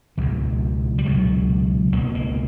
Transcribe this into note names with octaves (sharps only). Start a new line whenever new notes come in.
C#2 B2 F3
G3
C#2 B2 F#3
C#2 B2 A#3
A#3